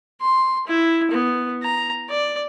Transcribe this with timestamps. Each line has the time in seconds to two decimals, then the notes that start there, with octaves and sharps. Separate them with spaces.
0.22 C6
0.67 E4
1.11 B3
1.63 A#5
2.10 D5